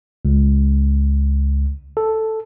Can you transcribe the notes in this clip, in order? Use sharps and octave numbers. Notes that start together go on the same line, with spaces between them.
C#2
A4